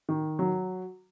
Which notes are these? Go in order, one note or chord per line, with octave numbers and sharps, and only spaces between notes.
D#3
F#3